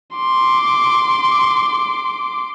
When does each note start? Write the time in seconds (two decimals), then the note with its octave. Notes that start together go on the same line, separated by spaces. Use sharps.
0.16 C6 D6